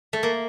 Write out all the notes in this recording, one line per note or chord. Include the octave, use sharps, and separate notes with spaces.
A3
A#3